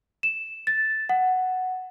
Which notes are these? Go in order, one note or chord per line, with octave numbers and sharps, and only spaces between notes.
E7
A6
F#5